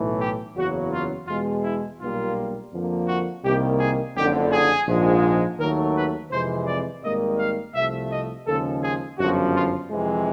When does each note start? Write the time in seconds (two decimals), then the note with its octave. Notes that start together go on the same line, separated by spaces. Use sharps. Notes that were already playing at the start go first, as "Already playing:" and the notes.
Already playing: B1 A2 E3 A3
0.20 G4
0.56 F#1 E2 C#3 F#3 F#4
0.92 F4
1.28 E2 B2 G#3 F4
1.64 E4
2.00 B1 A#2 G3 A#3 F4
2.72 F2 D3 F3 A#3
3.08 F#4
3.44 C2 C3 D#3 G3 A#3 G4
3.79 G#4
4.16 F#1 F2 D3 G4
4.51 G#4
4.87 A#1 G#2 F3 G#3
5.59 D#2 D#3 F#3 A3 A#4
5.95 B4
6.31 F2 C3 E3 G#3 C5
6.67 D5
7.03 G#1 G#2 D#3 G3 A#3 D#5
7.38 F5
7.75 C2 C3 F3 A3 E5
8.11 D#5
8.47 D#2 C#3 F3 G#3 A4
8.83 G#4
9.19 G1 F#2 C#3 F3 F#4
9.54 F4
9.91 F2 C3 E3 G#3